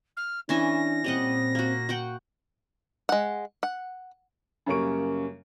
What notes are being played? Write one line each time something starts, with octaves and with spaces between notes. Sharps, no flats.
F6
E3 C#4 D4 E5 A#6
A#2 G3 C4 D#5 F#5
A#3 F#4
F#4 F#5 G5
G#3 F#5
F#5
F#2 C#3 G3 A#3 C#6 D7